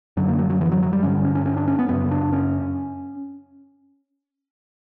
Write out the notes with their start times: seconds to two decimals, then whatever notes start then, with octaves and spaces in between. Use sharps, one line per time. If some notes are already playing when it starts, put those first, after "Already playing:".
0.17 F#2 D3 F#3
0.28 A#3
0.39 F#3
0.50 F#3
0.61 E3
0.72 F#3
0.83 F#3
0.93 G3
1.03 G2 D3 C#4
1.24 C#4
1.35 C#4
1.46 C#4
1.57 D4
1.68 C#4
1.79 B3
1.89 F#2 C#3 B3
2.11 D4
2.32 C#4